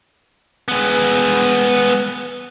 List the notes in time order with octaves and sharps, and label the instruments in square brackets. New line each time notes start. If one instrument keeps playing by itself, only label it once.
[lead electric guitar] G#3 B3